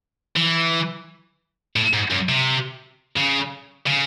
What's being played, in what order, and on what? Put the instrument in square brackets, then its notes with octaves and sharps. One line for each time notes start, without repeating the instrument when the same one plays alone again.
[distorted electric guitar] E3
A2
G#2
F#2
C3
C#3
C#3